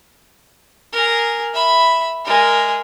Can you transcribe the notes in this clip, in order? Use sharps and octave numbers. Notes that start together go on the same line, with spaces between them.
G#4 A#4
E5 B5
G#3 A#4